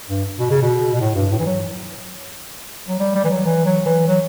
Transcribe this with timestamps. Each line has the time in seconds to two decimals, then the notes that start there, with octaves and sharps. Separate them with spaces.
0.09 G2
0.39 B2
0.51 C#3
0.62 B2
0.94 B2
1.00 A2
1.16 G2
1.31 A2
1.39 E3
1.46 F#3
2.89 F#3
2.99 G3
3.15 G3
3.24 E3
3.30 F#3
3.45 E3
3.66 F#3
3.86 E3
4.07 F#3